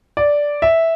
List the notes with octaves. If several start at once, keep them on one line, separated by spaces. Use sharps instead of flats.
D5
E5